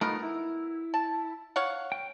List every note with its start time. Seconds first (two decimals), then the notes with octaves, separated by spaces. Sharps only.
0.01 A3 B3 D#4 F4 A#4
0.23 E4
0.94 A5
1.56 C#5 F5 F#5
1.92 G5